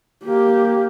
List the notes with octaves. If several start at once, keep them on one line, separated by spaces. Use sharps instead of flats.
A#3 G4